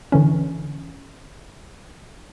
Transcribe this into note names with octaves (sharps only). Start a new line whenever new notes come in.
D3 E3 C#4